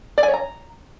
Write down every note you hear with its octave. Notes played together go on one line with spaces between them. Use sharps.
D5
G#5
C#5
A#5